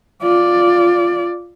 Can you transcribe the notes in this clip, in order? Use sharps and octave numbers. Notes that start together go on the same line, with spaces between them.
F4 D5